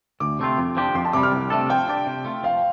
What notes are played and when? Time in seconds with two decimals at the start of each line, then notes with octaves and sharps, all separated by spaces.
0.20 D2 D6
0.39 C3 A3 C4 F4
0.58 F2
0.77 F3 D4 G4
0.95 F2 C6
1.05 A5
1.13 C3 G3 D6
1.23 F6
1.32 C2
1.50 C3 A3 D4 A4
1.70 F3 G5
1.88 D4 G4 D5
2.06 C3
2.25 A3 F4
2.43 F3 F5